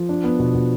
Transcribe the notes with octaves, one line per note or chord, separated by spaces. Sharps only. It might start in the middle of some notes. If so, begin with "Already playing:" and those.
Already playing: F3
D4
B3
B2
B2